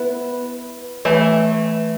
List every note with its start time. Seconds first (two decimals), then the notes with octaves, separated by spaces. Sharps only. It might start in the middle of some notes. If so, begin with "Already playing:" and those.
Already playing: B3 E4 B4
1.05 E3 A3